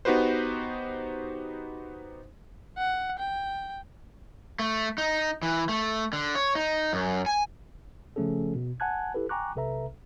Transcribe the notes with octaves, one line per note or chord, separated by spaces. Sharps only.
B3 D#4 F#4 G4 B4 C5
F#5
G5
A3
D#4
E3
A3
D3
C#5
D#4
F#2
G#5
C#3 F3 A3 C#4 G#4 A4
B2
F#5 G#5 A5 F#6 G#6
E4 G4 A4 B4
G5 G#5 A#5 C#6 D6 F#6
B1 C3 A4 B4 E5 A#5